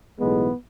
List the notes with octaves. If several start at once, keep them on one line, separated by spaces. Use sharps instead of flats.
B1 A2 E3 G#3 B3